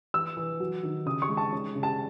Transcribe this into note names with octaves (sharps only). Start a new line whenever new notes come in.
E3 E6
E3
F#3
D#3
C#3 D#6
C#6
G#3
A5
C#4
C#3
A5